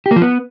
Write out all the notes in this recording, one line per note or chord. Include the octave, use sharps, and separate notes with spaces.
G4
A#3
F3
B3